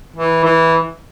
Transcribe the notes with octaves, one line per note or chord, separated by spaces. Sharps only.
E3
E3